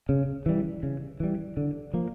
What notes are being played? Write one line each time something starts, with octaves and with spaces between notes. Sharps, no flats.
C#3
E3 G3
C#3
E3 G3
D3
F3 A#3